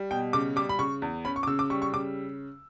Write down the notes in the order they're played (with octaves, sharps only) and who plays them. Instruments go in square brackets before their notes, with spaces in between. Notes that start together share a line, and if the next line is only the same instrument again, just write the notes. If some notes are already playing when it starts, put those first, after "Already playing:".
Already playing: [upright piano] G3
B2 G5
C#3 D6
G3 D6
B5
C#3 C#6
E2
C#4 B5
C#6
D6
C#3 E6
D6
G3 C#6
C#6
C#3 D6